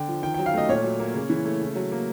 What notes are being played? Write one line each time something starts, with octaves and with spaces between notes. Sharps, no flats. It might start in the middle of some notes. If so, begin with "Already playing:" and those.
Already playing: D3 G5
F3
D#3 G5
G5
F#3
F5
A3 D#5
A#2 C#5
F#3
A#3
C#3
E3
A3
C#3
F#3
A#3